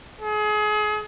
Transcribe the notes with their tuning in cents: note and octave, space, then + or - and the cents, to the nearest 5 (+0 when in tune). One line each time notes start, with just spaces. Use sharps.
G#4 +30